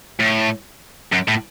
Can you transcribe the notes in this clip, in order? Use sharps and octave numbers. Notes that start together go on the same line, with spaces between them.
A2
F#2
A2